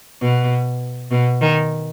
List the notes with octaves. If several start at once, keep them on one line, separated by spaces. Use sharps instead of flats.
B2
B2
D#3